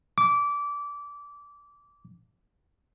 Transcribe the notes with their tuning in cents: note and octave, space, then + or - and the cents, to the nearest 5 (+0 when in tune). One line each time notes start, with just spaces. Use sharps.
D6 -20